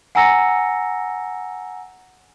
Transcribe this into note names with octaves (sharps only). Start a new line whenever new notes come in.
F#5 G#5 A#5 E6 A#6 C#7